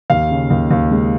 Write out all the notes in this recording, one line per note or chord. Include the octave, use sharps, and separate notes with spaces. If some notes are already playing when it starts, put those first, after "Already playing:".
D#2 F5
C#3
D#2
D#2
G#3